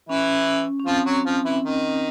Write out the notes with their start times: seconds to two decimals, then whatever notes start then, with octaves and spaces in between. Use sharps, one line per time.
0.09 E3 C#4 E4
0.80 C#4
0.86 F3 C4 F4
1.06 F#3 F#4
1.25 F3 F4
1.44 E3 E4
1.63 D#3 D#4